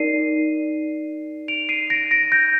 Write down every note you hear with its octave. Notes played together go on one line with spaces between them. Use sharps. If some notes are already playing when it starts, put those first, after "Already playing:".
Already playing: D#4 A#4 D5 C7 D#7
D7 F7
C7 D#7
A#6 D7
A#6 D7
G6 A#6